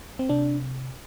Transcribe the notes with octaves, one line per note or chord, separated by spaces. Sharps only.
C4
C3 D4